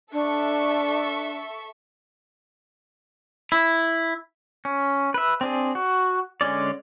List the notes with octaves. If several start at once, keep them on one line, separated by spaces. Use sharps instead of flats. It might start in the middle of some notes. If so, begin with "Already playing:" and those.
D4 A4 E5 C#6
E4
C#4
B4 E5
C4 D4 G#4
F#4
D3 G#3 C#4 D5